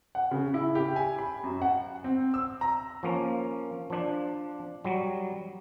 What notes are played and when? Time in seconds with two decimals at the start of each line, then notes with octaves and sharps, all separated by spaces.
0.15 F#5
0.31 C#3
0.54 E4
0.75 G4
0.96 G#5
1.18 B5
1.44 F#2
1.62 F#5
2.04 C4
2.34 E6
2.61 A#5
3.03 F3 A#3 C#4
3.90 F3 D4
4.85 F#3 G3